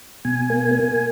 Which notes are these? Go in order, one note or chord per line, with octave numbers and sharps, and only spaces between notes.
B2 G#5
A#3
A#3